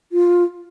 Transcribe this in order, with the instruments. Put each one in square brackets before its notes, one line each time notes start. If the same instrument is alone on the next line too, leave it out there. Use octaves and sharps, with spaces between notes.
[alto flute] F4